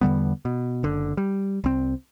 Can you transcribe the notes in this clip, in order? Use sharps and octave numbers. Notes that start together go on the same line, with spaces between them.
E2 D3 G3 B3
B2
F#1 D3
G3
C2 C4